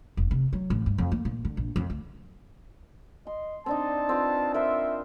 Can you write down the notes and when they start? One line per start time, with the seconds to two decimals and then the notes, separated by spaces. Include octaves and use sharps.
0.17 E1
0.31 C3
0.53 F#3
0.70 A1
0.86 G2
0.98 F2
1.12 A#3
1.25 A#2
1.45 D3
1.57 A#1
1.76 F2
1.90 D2
3.27 D#5 C6
3.66 C4 D4 D#4 A5
4.09 C4 F4 B4
4.54 A#4 C5 E5